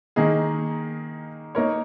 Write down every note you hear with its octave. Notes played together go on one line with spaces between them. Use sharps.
D#3 A#3 D#4 G#4
A#3 D#4 A#4 C#5